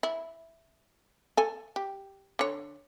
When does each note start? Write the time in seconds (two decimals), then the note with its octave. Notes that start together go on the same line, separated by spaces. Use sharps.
0.03 E4
1.37 A4 G#5
1.76 G4
2.39 D3 C#5